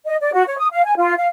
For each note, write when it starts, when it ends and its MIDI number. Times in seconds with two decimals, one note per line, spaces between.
0.06 0.16 75
0.20 0.32 74
0.33 0.44 66
0.47 0.58 73
0.59 0.67 87
0.71 0.84 77
0.85 0.95 80
0.97 1.13 65
1.17 1.27 77